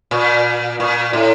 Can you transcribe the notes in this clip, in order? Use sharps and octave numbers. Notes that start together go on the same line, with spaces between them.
A#2
A#2
A2